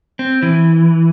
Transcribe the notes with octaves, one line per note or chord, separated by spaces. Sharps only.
C4
E3